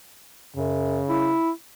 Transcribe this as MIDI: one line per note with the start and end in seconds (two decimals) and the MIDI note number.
0.56 1.01 42
0.56 1.37 49
1.09 1.50 64